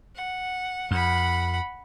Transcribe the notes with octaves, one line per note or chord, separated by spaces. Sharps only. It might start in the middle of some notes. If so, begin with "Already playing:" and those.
F#5
F2 F#5 B5